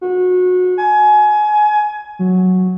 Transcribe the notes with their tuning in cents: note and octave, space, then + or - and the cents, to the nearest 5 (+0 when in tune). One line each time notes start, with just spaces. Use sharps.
F#4 -25
G#5 +25
F#3 -5